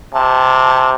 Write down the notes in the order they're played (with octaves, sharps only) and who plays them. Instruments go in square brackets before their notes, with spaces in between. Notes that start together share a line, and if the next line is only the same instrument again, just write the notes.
[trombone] C3 [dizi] A5